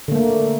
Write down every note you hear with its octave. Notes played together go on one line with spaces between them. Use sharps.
D3 A3 A#3